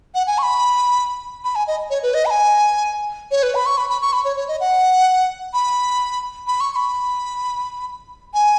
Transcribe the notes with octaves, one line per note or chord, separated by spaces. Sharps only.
F#5
G#5
C#6
B5
B5
G#5
D#5
C#5
B4
D#5
B5
G#5
C#5
B4
B5
C#6
B5
B5
C#6
B5
C#5
C#5
D#5
F#5
B5
B5
C#6
C#6
B5
G#5